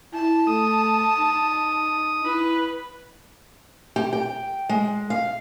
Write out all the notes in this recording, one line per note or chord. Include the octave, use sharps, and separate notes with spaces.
E4 A5
A3 D#6
D#4
E4 B4
G4
G5
G#3
F5